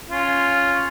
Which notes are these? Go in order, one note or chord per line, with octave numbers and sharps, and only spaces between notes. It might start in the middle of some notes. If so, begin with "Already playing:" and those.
C#4 F4